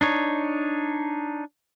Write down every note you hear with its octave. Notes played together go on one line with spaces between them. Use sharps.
D4 D#4 C#5